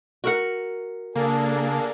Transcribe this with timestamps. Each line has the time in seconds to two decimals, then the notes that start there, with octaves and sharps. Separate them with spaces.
0.24 F#4 A#4 F#5
1.15 C#3 A#3 D4 G#4 A4